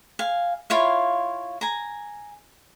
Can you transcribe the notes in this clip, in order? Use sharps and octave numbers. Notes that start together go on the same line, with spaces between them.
F5 G#5
E4 F4 C#5 F5
G#5 A#5